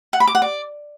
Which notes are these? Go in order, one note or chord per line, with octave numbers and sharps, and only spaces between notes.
F#5
B5
D6
F#5
D5